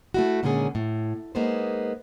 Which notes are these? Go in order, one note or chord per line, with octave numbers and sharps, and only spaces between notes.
A3 E4 F#4
A#2 D3 D#3 G#3 C#4 G#4
A2
G#3 A#3 B3 D#4 G#4 C5